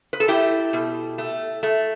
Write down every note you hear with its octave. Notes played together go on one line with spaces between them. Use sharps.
B4
A4
A3 E4 G4
B2
A3
A3